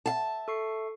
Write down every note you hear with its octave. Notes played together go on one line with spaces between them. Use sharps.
E5 F5 A5
A4 C#6 C7